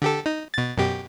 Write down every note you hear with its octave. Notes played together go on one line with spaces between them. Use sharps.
D3 G4 A4
D#4
B2 A6
F#2 B2 G4